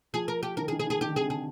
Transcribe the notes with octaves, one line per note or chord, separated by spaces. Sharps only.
F3 G#4
A#4
G4
D#3 A#4
G#4
D#3
G#4
D#3
G#4
D#3 G4
D3
C3 G#4
D3
G#4